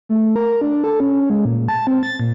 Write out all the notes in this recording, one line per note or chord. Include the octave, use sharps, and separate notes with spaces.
A3
A#4
D4
A4
C#4
G#3
A#2
A5
C4
A6
A#2